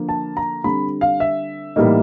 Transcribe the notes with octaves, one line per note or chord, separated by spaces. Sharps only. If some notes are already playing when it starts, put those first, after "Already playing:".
Already playing: D3 F3 A#3
A5
A#5
D3 G3 C4 B5
F5
E5
A2 E3 G3 A#3 D#4